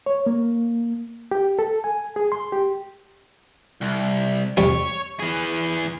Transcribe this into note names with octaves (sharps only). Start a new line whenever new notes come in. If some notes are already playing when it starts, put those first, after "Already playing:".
C#5
A#3
G4
A4
G#5
G#4
C6
G4
C2
F2 G3 C#5
E3 G#4